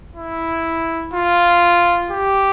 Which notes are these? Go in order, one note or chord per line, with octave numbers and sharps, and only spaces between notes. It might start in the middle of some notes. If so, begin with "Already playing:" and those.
E4
F4
G4